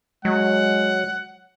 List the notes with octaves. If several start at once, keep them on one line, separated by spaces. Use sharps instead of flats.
F#3 G#3 F#5